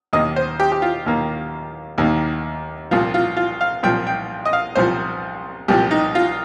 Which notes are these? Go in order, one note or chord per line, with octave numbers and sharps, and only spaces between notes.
D#2 D#3 A#3 D#5
C5
G4
G4
F4
D#2 D#3 A#3
D#2 D#3 A#3
C2 A#2 F3 F4
F4
F4
F5
C2 A#2 F3 G5
G5
D#5
F5
C2 A#2 F3 C5
C2 A#2 F3 G4
D#4
F4